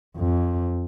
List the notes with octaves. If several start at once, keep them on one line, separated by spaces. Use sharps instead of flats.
F2